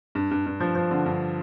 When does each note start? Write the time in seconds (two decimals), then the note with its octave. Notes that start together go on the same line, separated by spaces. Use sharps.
0.15 G2
0.31 G2
0.46 G2
0.60 F3
0.75 F3
0.91 D3
1.06 G2